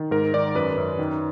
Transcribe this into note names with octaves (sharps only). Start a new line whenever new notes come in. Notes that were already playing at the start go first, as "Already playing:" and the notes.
Already playing: D#3
G#2 A#4
D#3 D5
F#2 B4
F#2
D#3